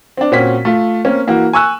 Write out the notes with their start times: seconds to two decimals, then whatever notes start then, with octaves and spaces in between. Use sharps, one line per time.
0.17 C4 D4
0.32 A#2 C4 C#4 F#4 B6
0.65 A3 F4
1.05 A#3 C4 C#4
1.27 E3 A#3 E4 F#4
1.53 G#5 C#6 E6 F#6